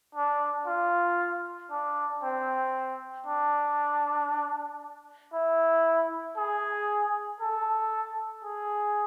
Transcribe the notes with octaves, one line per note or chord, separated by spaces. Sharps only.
D4
F4
D4
C4
D4
E4
G#4
A4
G#4